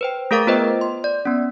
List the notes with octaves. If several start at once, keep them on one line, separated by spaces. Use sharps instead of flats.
B4 C5 G5
A3 G#4 A#4 F5 D6 A6
B3 F4 B4 C5 D#5 G5
C6
D5
B3 C#4